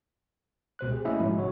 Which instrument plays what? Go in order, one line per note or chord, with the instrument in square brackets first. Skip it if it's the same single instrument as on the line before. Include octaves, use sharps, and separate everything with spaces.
[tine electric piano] C#2 B2 C5 F#6
G4 G#4
A3 A#3 C#4 E4 D#5 E5
G#2 F3 F#3 G#3 E4
A1 C#3 F#4 C#5